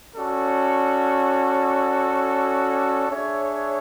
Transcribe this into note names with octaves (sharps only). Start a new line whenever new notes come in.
C#4 F#4 A4 D5
D4 G#4 C#5 E5